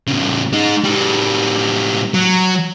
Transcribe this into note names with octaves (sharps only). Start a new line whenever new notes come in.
A2 C#3
G#3 D#4
A2 G3
F#3